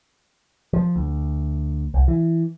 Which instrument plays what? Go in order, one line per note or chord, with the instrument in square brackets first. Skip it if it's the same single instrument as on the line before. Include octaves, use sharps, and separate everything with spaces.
[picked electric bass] F3
D2
C2
E3